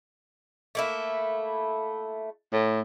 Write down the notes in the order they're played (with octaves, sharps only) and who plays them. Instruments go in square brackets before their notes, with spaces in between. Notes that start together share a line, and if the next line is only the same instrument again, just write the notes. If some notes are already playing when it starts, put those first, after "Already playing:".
[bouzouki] A3 A#3 E4
[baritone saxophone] A2